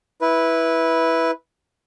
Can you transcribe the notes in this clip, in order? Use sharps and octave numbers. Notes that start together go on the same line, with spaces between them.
E4 B4